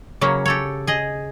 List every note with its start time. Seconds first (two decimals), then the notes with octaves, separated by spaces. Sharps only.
0.21 C#3 F#3 A#3 C#4
0.46 G4 A4 C#5
0.87 G#4 D#5